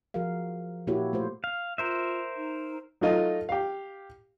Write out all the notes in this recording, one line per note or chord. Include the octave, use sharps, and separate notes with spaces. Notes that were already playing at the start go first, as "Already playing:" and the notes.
F3 F#4 G#4 A#4 F5
A#2 A#3 E4 F#4 G4 C#5
A3 F4 C5
F5
F4 A#4 C5 E5
D#4
F#3 A3 D#4 F4 D#5
G4 F5